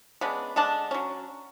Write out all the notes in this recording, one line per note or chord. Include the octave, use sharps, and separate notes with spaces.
C#3 G#3 B3 D4
D3 G#3 D4 A5
F#3 C#4